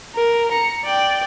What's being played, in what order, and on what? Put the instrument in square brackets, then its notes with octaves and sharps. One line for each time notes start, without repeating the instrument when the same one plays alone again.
[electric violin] A#4
A#5 C#7
D5 G5